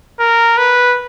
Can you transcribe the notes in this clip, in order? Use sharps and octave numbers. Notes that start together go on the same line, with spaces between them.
A#4
B4